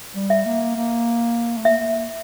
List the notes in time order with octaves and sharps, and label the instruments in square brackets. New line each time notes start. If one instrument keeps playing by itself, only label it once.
[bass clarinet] G3
[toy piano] E5
[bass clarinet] A#3
A#3
A3
[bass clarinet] A#3 [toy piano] E5